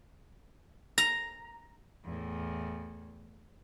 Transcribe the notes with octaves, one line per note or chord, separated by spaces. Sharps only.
A#5
E2 A2